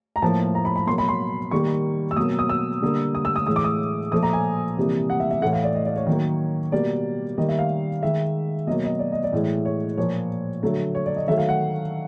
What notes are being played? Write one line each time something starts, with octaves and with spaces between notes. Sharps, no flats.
A#5
A2 F3 A#3 A5
A#5
B5
B5
B2 F#3 A#3 C6
B5
C6
D#3 G3 A#3 C#6
E6
B2 F#3 A#3 D#6
D#6
E6
D3 G3 A#3
D#6
E6
D#6
A2 E3 G#3 D#6
D6
D#6
A#2 F3 A3 D#6
A#5
G#5
C3 E3 G3 A#3
F#5
E5
E5
A2 E3 A3 F#5
F5
D5
D#5
D5
C#5
D#3 F#3 A#3
B2 G3 A#3 D5
D#3 G3 A#3 D#5
E5
F5
D#3 G#3 E5
B2 F#3 A#3 D#5
D#5
D5
D#5
D5
A2 E3 G#3
C#5
A#2 F3 A#3 C#5
D3 F#3 A3
C#5
D5
D#5
D#3 F#3 A3 E5
F5
F#5